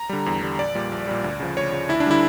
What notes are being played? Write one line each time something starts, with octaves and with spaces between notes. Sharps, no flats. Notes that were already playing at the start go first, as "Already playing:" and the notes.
Already playing: A#5
D3 G3
E2
D3 G3
A#1 D5
A#2 G3
A#1
A#2 G3
D2
C#3 F3
D2 C#5
C#3 F3
D2 E4
D4
D3 G3 E4